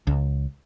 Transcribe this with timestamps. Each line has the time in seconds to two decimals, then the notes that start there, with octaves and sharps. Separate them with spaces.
0.07 C#2